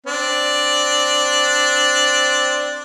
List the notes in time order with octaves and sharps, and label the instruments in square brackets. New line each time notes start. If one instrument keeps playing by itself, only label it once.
[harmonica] C4 D4